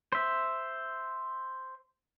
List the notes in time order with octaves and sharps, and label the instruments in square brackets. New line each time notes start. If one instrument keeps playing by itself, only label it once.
[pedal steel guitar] C5 E5